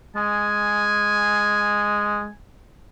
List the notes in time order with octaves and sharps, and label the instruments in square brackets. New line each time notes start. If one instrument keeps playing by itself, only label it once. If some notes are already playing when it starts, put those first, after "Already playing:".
[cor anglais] G#3 [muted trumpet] G#5